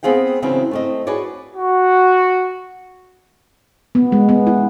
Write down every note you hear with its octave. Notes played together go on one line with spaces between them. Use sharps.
B3 C4 G#4 F5 G5
C#3 E3 F#3 B3 C4 D4
A3 C4 D#5
F#4 G#4 B4 C#5 D5
F#4
B3
G#3
B3
E4